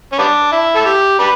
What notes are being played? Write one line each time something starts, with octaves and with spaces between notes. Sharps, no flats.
C#4
G3 B3 D4
E4
A4
G4
D4 G4 B4